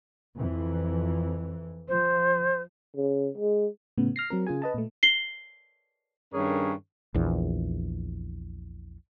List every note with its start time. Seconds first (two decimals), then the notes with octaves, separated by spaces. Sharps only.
0.37 F2 E3
1.88 F3 C5
2.96 C#3
3.38 G#3
3.98 A2 C#3 B3
4.16 F6 A#6 C7
4.30 F#3 C4 A#4
4.47 C#3 F4 G#4 G#5
4.62 B4 D#5 A5
4.74 A#2 A3
5.03 C7 G7
6.33 G2 D#3 C#4 G#4 A#4 C#5
7.14 A#1 E2